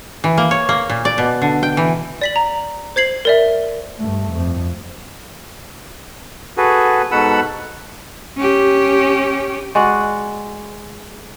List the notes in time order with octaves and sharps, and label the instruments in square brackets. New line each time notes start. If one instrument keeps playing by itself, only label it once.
[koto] E3
A#3
C#5
A#3
A#2
D5
B2
D3
G5
E3
[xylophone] D5 B6 F#7
A#5
C5 G#6 C7 F#7
A#4 D5 E5
[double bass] G2 A3
F2
[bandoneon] F#4 G#4 A4 B4
G#2 B2 A4 F#5 B5 E6
[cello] C#4 G4
[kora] G#3 F#4 D5 F#5